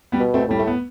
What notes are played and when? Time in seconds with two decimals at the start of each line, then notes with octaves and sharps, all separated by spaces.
0.12 G3 B3
0.20 B2
0.34 A3 C4
0.48 A2 G3
0.59 A3
0.67 B3